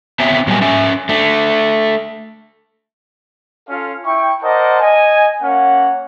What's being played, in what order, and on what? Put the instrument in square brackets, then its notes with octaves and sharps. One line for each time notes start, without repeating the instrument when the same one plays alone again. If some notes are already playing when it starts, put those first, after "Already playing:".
[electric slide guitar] B3 C4 C#5 E5 G#5
A#2 F#3 G3 A#3 B3 G#5
C#4 E5 G#5
A3 D4
[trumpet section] C#4 F4 A4 F5
E4 G5 C#6
A#4 C5 D5 D#5 F#5 A5
D#5 G#5
A#3 C#4 F#5